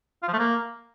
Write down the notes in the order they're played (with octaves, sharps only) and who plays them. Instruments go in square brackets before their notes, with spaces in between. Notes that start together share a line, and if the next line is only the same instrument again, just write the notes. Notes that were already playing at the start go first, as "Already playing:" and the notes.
[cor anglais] F4
F3
A3
A#3